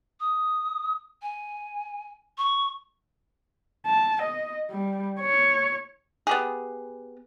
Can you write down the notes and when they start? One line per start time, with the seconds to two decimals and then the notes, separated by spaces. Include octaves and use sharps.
0.20 D#6
1.22 G#5
2.38 C#6
3.86 A5
4.22 D#5
4.71 G3
5.20 C#5
6.27 B3 G4 G#4